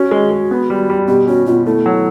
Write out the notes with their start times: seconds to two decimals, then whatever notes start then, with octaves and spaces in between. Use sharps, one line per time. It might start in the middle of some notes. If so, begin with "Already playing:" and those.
Already playing: C#4 F#4
0.11 G#3
0.31 G#3
0.51 B3
0.70 G3
0.90 G3
1.08 B2 G4
1.28 C#4 F#4
1.46 B2 F4
1.66 A3 E4
1.86 F#3